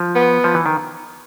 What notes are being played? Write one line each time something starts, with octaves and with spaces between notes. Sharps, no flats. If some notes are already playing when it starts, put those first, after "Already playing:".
Already playing: F3
B3
F3
E3
D#3